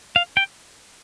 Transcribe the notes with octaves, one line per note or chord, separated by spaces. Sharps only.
F5
G5